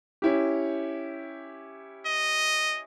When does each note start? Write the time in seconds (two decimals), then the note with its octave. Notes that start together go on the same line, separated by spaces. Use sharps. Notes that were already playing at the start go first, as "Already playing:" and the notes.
0.22 C#4 E4 G4
2.06 D#5